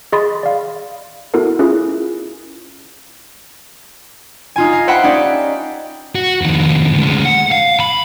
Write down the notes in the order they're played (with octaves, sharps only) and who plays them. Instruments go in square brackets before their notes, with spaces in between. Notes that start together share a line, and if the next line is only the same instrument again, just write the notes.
[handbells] G#4 D#5 B5 C6 A6
D5 F5
B3 E4 F#4 A4 A#4
C#4 E4 F4 G#4
[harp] D#4 F4 G#5
F5 A#6
C5 E5 F#5 G5 B5
C#4 D#4 G4 D5
[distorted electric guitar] F#4
F2 D#3
D2 G#3
F#5
F5
B5